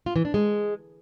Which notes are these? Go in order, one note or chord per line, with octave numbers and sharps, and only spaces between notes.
F4
E3
D4
G#3